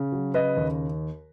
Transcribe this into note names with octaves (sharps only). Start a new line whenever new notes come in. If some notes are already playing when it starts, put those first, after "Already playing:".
Already playing: C#3
F#3
C#3 B4 D#5
D#2